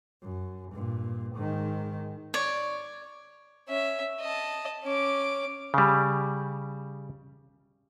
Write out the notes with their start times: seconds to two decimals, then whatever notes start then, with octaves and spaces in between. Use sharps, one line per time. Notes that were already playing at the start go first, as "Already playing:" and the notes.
0.22 F#2
0.72 G2 A#2
1.35 G#2 D#3
2.34 C#5 D5
3.68 C#4 E5
4.21 D#5 A5
4.84 C#4 D6
5.74 C#3 G3